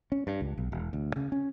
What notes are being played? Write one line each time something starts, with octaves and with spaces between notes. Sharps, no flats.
C#4
G2
C#2
B1
E1
D2
C#3
C#4